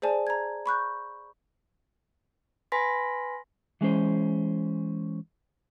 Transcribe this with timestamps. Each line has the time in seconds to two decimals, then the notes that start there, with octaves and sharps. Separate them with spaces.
0.02 G#4 C5 D5 G#5 A5
0.27 A#5 G#6
0.66 B5 C#6 F#6 G6
2.72 B4 G#5 B5 C6 A#6 B6
3.81 E3 G#3 C#4 C5